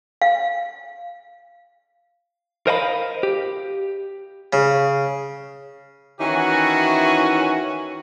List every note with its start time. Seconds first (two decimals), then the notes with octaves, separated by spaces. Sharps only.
0.22 F5
2.67 A#4 C5 D#5 F5 F#5 B5
3.23 G4
4.53 C#3
6.20 D#3 E3 C#4 E4 F#4